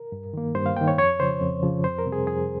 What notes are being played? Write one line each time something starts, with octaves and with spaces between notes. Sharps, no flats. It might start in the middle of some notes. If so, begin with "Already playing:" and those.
Already playing: A#4
G2
D#3 A#3
G2 C5
F5
D#3 A#3 G5
C#5
F2 C#5
C#3 F3 C5
F2
C#3 F3
F2 C5
A#4
C3 G3 C4
G#4
F2 G#4